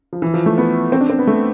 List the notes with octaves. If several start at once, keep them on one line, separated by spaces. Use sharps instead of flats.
F3
E3
F3
A3
B3
C4
D4
C4
B3
A3